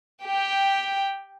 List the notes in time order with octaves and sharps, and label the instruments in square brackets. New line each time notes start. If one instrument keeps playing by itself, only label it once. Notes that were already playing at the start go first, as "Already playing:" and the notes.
[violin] G4 G5